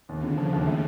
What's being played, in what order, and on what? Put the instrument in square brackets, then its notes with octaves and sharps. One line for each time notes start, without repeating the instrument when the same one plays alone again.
[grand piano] D#2 [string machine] C#3
[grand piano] D3
[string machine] C#3 [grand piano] F3
[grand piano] D#2
A3